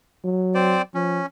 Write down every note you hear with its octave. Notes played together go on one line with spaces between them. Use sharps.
F#3
C4 C5 D5
F3 C#4